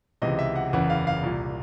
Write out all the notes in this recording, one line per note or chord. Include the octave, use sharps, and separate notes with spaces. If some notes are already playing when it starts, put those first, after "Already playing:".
C#2 C3 E3 D#5
E5
F#5
F#1 E2 C#3 E3 F#5
F5
F5
C2 A#2